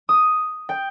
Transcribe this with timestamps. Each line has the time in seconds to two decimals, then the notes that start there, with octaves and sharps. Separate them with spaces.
0.09 D#6
0.69 G5